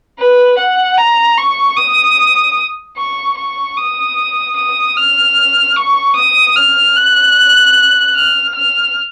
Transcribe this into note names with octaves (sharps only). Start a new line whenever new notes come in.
B4
F#5
A#5
C#6
D#6
C#6
C#6
D#6
D#6
F6
C#6
D#6
F6
F#6
F6
F6